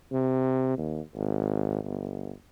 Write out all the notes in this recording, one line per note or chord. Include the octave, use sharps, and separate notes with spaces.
C3
D#2
G#1
G1